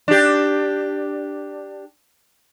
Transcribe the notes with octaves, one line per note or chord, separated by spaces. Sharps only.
D4 G4